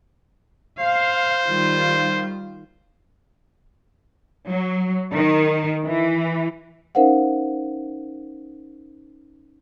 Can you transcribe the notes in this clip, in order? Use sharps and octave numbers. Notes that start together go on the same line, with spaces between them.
C5 F5
D#3 G3 F4
F#3
D#3
E3
C#4 D#4 A#4 C5 F5 F#5